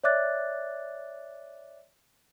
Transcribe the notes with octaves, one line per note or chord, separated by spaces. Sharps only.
C#5 D5 E5 D6 F#6 A6